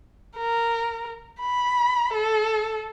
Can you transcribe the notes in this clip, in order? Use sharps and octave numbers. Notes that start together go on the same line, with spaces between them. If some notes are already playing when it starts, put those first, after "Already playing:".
A#4
B5
A4